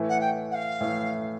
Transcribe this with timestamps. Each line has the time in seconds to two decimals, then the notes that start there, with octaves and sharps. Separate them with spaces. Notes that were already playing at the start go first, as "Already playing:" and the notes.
Already playing: A2 E3 A3
0.09 F#5
0.21 G5
0.51 F#5
0.55 F5
0.81 A2 E3 A3